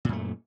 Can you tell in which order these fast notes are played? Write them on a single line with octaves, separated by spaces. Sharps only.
A#2 F#2 A3